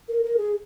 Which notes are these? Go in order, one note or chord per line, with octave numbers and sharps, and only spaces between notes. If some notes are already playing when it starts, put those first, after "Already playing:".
A#4
A#4
G#4